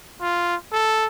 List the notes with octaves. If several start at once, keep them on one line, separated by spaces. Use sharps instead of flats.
F4
A4